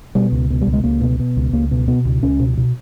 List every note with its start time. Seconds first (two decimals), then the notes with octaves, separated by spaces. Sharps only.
0.15 B2 G3
0.32 C#2
0.50 B2
0.61 G3
0.67 C#2
0.73 G#3
0.84 C#2 A#3
1.01 B2
1.20 B2
1.37 C#2
1.53 C#2 A#3
1.71 B2
1.88 B2 B3
2.05 C#2
2.23 C#2 C#4
2.39 B2
2.57 B2